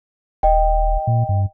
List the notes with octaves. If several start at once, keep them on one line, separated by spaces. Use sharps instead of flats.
D#1 D#5 G5
A#2
G2